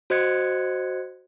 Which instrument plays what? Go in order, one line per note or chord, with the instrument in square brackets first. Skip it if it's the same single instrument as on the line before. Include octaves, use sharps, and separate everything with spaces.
[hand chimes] F#4 C5 D#5 F#6 G#6 C#7